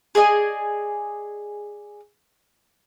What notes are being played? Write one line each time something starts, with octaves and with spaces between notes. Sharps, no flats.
G#4 D5 D#5 G#5